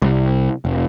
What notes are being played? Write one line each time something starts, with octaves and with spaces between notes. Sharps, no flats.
C2
F1